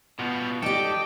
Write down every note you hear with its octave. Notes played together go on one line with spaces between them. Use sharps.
B2 G3 B3 F4
D#4 G4 A4 D5 D#5 G5